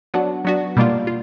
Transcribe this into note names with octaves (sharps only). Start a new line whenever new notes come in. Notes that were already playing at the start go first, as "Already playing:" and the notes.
F#3 B3 D4 F#4
F#3 B3 D4 F#4
B2 G3 A#3 D4 F4
F4